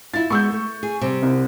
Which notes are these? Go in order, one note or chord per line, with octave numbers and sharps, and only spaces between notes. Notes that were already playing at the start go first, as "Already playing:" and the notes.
E4 F4 A6
G#3 B3 C#6 E6 G6
A3
G#4
C3 G3
C2